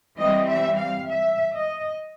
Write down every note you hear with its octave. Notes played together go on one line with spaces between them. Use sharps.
E3 G3 C4 D#5
E5
F5
E5
D#5